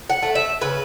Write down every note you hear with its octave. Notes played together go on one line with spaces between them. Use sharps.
F#5
A3
E5
C#3 B4